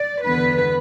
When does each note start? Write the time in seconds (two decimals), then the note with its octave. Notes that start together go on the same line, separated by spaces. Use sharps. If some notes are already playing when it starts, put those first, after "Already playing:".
Already playing: D5
0.24 E2 D3 B3 B4